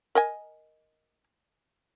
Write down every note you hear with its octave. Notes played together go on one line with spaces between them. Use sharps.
A#4 D#5 G#5